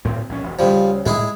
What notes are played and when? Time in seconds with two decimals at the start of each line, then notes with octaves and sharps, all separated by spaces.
0.05 D2 A2 C4
0.29 A#1 C#4
0.43 E1
0.59 D2 C#3 F3 G3
1.06 A2 G#3 E4 G#4